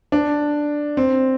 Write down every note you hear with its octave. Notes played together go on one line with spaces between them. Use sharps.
D4
C4